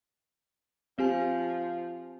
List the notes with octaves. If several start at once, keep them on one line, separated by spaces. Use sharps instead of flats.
F3 C4 G4 G#5